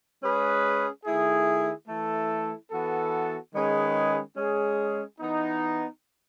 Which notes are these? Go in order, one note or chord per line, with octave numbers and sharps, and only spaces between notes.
G#3 C#4 G#4 B4
D#3 A3 E4 G#4
E3 A3 E4 A4
E3 B3 F#4 A4
D#3 G#3 C#4 G#4 B4
G#3 C#4 G#4
E3 B3 D#4